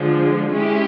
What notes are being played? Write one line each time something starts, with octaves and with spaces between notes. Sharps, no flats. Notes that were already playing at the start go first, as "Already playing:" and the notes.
Already playing: D3 F3 G#3
G#3 C#4 E4 G4